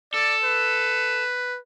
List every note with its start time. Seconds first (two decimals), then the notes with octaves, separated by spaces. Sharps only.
0.14 A4 D5
0.44 B4